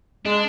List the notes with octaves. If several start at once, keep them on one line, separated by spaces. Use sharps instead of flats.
G#3 D4